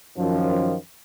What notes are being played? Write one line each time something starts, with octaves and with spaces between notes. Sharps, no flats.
F#2 D#3 F3